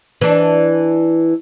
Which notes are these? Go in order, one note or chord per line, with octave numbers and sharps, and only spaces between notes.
E3 D4